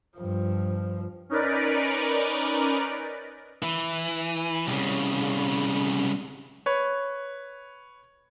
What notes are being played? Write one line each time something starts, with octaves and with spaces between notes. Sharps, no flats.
G2 F3
C#4 D#4 A#4 B4 D5
E3
C2 C#3
B4 C#5